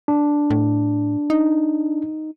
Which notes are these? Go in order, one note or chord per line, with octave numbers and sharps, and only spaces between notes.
D4
A2
D#4